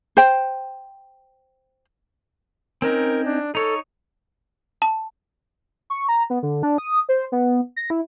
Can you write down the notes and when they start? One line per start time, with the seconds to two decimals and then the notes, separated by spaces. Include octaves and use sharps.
0.17 C5 G5
2.82 C4 C#4 D#4 A#4
3.25 D4
3.55 D#4 A4 C#5
4.82 A5
5.90 C#6
6.09 A#5
6.30 B3
6.43 D3
6.63 D4
6.78 D#6
7.09 C5
7.32 B3
7.76 A#6
7.90 E4